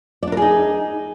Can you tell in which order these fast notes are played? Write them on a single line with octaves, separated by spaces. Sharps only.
D5 D4 A#4 G#4 D#4